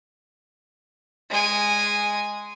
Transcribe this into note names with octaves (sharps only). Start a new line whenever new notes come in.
G#3 G#5